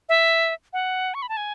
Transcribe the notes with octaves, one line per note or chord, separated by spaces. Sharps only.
E5
F#5
C#6
B5
A5
G#5